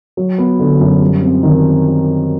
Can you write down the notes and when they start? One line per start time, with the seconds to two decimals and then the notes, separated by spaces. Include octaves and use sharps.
0.17 F#3
0.38 B3
0.59 D3
0.80 F#2
1.01 G3
1.22 C4
1.43 D#3